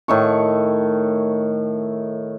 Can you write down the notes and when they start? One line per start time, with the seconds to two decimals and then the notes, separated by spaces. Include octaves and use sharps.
0.08 A2 D#3 C#6